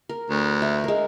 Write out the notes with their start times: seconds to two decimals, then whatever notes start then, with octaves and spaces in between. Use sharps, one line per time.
0.09 A#4
0.29 D2
0.62 E5
0.84 G#3 A#4